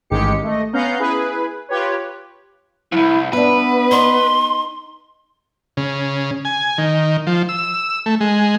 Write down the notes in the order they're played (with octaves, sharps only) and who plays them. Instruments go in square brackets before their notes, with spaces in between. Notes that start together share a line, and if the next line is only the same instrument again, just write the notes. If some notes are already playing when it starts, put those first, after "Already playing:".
[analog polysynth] A1 G#2 D#3 G#3 G4 C#7
A3 D#5
B3 C#4 F5 F#5 A#5 G6
E4 G#4 B4
F4 G4 B4 C#5
[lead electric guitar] C2 F2 [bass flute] E4
[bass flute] B3 [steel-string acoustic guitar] D4 E5 [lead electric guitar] B4
[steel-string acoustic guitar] D#4 [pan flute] C6
[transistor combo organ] C#3
G#5
D#3
F3
E6
A3
G#3